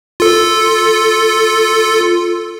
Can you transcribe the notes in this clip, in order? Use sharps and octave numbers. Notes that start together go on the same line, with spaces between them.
F4 A4